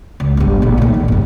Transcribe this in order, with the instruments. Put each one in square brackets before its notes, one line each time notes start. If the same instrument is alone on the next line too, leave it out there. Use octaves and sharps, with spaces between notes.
[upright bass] C#2
G1 G2
A#1 A#2
A2 D#3
E2
G1 F2